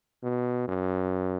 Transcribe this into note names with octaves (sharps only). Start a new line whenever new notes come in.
B2
F#2